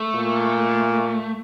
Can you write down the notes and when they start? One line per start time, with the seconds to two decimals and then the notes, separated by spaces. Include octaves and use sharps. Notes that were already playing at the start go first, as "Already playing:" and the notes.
Already playing: A3
0.15 A#2